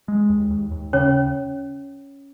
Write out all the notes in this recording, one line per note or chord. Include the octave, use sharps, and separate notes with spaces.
G#3
D#2
D#2
D#2
C#3 C#4 C#5